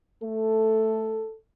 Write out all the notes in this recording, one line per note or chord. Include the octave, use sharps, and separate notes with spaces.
A3 A4